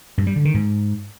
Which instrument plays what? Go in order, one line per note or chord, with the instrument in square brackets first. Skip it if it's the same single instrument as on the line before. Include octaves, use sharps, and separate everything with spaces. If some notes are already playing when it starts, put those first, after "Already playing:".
[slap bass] G2
G3
D3
D#3
G#2